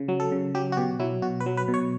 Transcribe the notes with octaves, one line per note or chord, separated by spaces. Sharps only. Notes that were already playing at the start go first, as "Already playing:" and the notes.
Already playing: C#3
F#3
A4
C#3
F#3 G4
F#4
B2 G4
F#3 E4
B2 F#4
B4
F#3
B4
B2
C#5